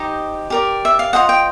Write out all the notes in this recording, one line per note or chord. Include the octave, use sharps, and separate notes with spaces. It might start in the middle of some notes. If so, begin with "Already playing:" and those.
Already playing: D#4 G4 C5 D#5
G4 A#4 D5
E5
F5
F4 G#4 C5 D#5 F#5
G5